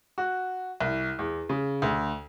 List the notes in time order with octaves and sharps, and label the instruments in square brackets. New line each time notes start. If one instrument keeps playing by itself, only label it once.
[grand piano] F#4
C2
E2
C#3
D2